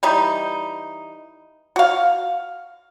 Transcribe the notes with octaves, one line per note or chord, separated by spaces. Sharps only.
E3 G3 D#4
F#4 F5